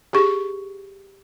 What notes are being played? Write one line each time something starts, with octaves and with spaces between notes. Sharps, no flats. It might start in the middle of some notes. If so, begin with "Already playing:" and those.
G4 G#4 C#6